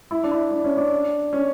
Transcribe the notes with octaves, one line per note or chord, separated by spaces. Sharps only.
E4
D4
E4
D4
C#4
D4
C#4